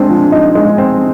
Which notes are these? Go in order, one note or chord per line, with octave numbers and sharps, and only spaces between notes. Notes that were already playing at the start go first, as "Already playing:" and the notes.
Already playing: G#3 C4 D4
F3
D#4
G#3
C4